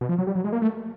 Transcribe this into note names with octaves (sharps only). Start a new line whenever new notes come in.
B2
F3
F#3
G3
F#3
G#3
A#3
A3